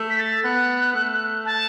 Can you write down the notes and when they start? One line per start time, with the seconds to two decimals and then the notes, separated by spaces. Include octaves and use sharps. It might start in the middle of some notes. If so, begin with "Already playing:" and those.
Already playing: A3
0.10 B6
0.18 A6
0.44 B3 F#6
0.94 A3
1.45 A5